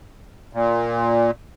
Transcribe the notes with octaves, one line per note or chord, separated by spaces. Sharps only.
A#2